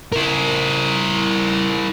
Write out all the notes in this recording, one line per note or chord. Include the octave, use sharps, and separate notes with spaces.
E4 A#4